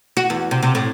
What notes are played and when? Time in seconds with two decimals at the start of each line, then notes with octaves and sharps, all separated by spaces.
0.17 F#4
0.30 E2
0.51 C3
0.63 C3
0.75 A2